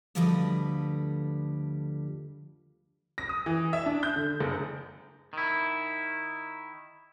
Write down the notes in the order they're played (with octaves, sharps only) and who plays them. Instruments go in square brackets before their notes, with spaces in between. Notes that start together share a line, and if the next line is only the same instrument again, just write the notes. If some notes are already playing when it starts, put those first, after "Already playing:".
[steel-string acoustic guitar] D2 D3 F3 G3 B4 D#5
[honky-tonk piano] A#6
D#6
E3
E5
D4
G6
D3
F#1
[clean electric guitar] D#3 E4